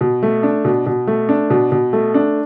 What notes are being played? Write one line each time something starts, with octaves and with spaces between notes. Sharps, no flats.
B2
A3
D4
B2
B2
A3
D4
B2
B2
A3
D4